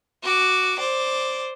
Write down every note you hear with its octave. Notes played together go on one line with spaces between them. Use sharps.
F#4 D6
C5 D5